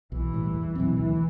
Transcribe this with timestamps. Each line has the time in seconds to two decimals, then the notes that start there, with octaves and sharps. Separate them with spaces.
0.12 B1 E3
0.33 A2 G3
0.54 E2
0.75 B2 F#3 C4
0.96 D2 E3